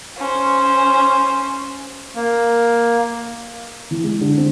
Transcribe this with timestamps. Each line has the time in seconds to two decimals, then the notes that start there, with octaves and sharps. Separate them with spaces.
0.18 C#4 C5
2.16 A#3
3.91 E3
4.04 G#3
4.21 D3
4.37 C4